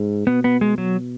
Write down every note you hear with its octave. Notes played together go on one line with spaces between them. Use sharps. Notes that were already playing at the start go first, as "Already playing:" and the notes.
Already playing: G#2
B2 B3
B3
G#3
B2 F#3